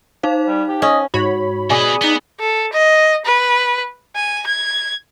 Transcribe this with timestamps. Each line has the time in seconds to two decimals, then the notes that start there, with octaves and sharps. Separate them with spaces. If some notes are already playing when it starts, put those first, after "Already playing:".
0.23 D#4 C5 F5
0.47 G3
0.68 G4
0.82 C#4 D#5
1.14 G#2 F#4 C#5 B5
1.70 B2 G#4 B4 D5 G#5
2.01 B3 D#4 D#7
2.40 A4
2.72 D#5
3.25 B4
4.15 G#5
4.46 G#6